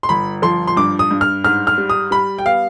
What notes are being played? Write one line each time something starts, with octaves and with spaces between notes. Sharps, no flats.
C6
G1 B5
F3 C6
C6
G2 D6
D#6
G2
F6
G#2 F6
F6
G3
D#6
G3 B5
G5
B3 F5